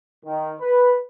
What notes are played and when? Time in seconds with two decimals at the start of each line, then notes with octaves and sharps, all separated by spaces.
0.24 D#3
0.61 B4